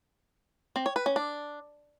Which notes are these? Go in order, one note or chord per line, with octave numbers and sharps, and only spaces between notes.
C4
C#5
B4
C#4
D4